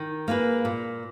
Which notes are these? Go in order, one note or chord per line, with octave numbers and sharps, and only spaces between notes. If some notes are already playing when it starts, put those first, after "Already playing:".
Already playing: D#3
A#3 F4 G#4 B4
A#2